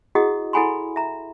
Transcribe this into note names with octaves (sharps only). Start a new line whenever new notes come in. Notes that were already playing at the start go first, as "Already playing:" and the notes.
E4 F#4 G#4 D#5 F#5 D#6
E4 A4 F#5 G#5 B5 C6
E5 A#5